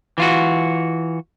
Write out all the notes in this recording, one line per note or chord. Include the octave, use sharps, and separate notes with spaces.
E3 F4 F#4